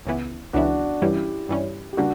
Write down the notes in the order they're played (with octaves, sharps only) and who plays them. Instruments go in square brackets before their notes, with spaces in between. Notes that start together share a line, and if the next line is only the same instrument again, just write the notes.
[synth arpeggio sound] C#2 C#3 E3 B3 E4
[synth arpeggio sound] C#2 C#3 E3 B3 E4 [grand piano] D4 F#4
[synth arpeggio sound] G2 E3 G3 C#4 [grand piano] E4 G4
[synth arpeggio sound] G2 E3 G3 C#4
[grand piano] G4
[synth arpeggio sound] C#3 G3 A#3 [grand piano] D4 F#4